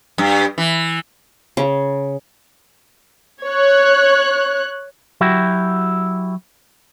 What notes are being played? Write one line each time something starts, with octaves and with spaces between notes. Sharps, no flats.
G2
E3
C#3
C#5 F#6
F#3 E4 F#4 G4